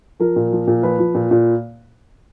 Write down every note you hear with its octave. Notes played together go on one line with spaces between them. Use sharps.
F3 A#4
A#2
F3
A#2
F3 B4
F3
A#2
A#2